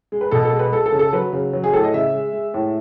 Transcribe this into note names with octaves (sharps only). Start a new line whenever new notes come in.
G#3
B4
B2 A4
A4
G#3
B4
G#3 A4
A4
C#3
A4
F#3 B4
C#3
F#3
G#4
A2 A4
D#5
C#3 E5
G#3
G#3
A2